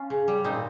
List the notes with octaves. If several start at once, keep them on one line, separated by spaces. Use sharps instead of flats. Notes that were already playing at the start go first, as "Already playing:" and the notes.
Already playing: C#4 F4
C#3
G3
A#2 C4 D#4